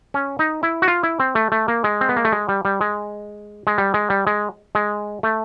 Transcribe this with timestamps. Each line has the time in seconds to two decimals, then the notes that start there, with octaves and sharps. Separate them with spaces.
0.14 C#4
0.39 D#4
0.63 E4
0.82 F#4
0.88 F4
1.03 E4
1.20 C4
1.35 A3
1.52 A3
1.68 A#3
1.84 G#3
2.01 C4
2.09 B3
2.17 A#3
2.25 A3
2.32 G#3
2.49 G3
2.65 G3
2.81 G#3
3.67 G#3
3.78 G3
3.94 G#3
4.10 G3
4.27 G#3
4.75 G#3
5.23 A3